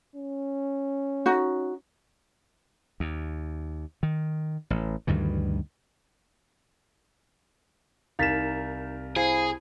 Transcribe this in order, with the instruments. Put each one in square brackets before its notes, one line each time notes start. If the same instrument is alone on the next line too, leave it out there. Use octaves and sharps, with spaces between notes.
[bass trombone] C#4
[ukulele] D#4 F#4
[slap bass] D#2
D#3
A1
D2 G2 D#3 E3
[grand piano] C2 A#4 E7 [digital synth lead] D#4 [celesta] F5 A6 B6
[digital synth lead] E4 [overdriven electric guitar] G#4 [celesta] C5 F5 C7